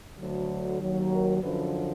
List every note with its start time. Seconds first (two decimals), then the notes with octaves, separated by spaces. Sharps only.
0.16 D2 D3 F#3
0.80 D#2 D#3 F#3
1.11 A#4
1.42 F#2 D3 F3 B4